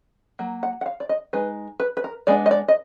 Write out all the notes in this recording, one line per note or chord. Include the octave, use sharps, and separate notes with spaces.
F#3 A#3
F#5
F#5
F5
D5
D#5
G#3 D#4 B4
B4
B4
A#4
G#3 B3 D4 D5
D#5
D5
D#5